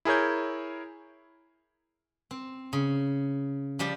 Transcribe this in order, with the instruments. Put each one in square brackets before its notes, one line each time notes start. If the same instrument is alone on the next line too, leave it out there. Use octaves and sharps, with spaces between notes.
[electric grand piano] E4 G#4 A#4 C#5 G6
[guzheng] C4
C#3
F3 G3 G4